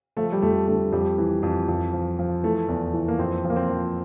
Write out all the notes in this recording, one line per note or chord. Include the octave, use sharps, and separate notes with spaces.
F3 A3
G3
F2 A3
D3 A3
F2 G3
E3
F2
F2
F3
F3
E3 A3
E2
E3
A#3
F2 C4
F3
A#3
C4
F3